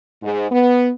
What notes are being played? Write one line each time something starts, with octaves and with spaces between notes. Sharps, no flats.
G#2
B3